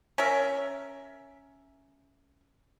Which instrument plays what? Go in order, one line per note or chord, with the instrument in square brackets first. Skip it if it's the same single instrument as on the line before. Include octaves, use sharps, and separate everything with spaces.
[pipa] C#4 A#4 E5